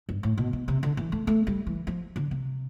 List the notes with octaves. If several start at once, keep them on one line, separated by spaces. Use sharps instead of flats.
G2
A2
B2
B2
C3
D3
E3
A3
A3
G3
E3
F3
D3
C3